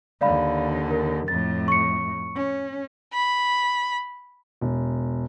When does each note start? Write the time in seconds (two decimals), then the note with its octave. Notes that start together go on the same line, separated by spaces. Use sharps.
0.21 D#2 D3 D5 F5 B5
0.91 A#4
1.28 F2 A2 A6
1.68 C#6 C#7
2.35 C#4
3.13 B5
4.61 E1